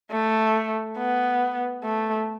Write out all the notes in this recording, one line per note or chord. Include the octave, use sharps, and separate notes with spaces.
A3
B3
A3